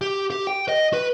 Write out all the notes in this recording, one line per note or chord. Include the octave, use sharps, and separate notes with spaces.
G4
G4
G5
D#5
B4